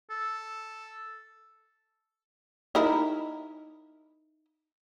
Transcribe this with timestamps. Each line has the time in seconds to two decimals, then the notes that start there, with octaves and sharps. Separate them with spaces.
0.10 A4
2.75 D#4 E4 A#4